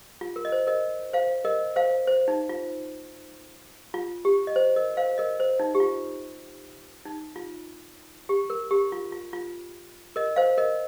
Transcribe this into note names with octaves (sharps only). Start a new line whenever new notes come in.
F4
A#4
D#5
C5
A#4 D#5
C5 F5
A#4 D#5
C5 F5
C5
D#4
F4
F4
G4
D#5
C5
A#4 D#5
C5 F5
A#4 D#5
C5
D#4
G4
F4
D#4
F4
G4
A#4
G4
F4
F4
F4
A#4 D#5
C5 F5
A#4 D#5